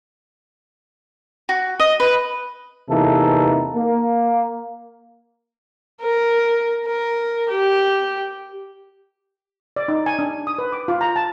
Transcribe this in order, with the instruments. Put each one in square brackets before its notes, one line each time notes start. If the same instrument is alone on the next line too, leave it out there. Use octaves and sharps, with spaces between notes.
[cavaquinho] F#4
D#5
B4
[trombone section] E2 C3 E3 A#3 D#4 A4
A#3
[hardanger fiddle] A#4
A#4
G4
[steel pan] D5
D#4
G#5
D4
D#6
B4
D6
F4
A#5
A5